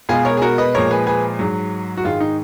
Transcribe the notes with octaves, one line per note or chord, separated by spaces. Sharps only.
B2 G#3 F4 G#4
A#4 C#5
G#4
F#4 A#4
B4 D#5
A#2 F3 G#3 A#4 C#5
G#4 B4
G#4 B4
G#2 F#3
F#4
G#2 D#3 G#3 F4
D#4